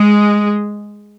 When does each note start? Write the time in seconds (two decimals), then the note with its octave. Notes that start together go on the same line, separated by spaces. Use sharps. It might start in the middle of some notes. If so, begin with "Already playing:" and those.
Already playing: G#3